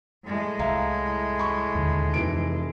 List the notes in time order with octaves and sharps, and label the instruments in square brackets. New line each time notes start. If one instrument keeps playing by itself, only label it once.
[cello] A2 G#3
[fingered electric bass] C2 [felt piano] E5 F5 A#5
[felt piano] B5 C#6
[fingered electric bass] D#2 A#2 D3
[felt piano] F1 E3 D7 [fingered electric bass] C3